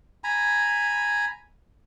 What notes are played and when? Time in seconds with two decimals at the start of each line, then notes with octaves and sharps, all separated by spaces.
0.24 G#5 A#5 B5